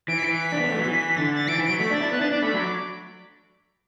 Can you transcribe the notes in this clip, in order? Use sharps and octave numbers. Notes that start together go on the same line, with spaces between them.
E3 D7
B6
E3 D7
B6
D4
B3
A3
F#3
E3
D3 A6
A6
E3 D7
E3
D7
F#3
A3 B6
D4 A6
E4
B3 F#6
D4 A6
D4 D6
A3 B5
F#3
D6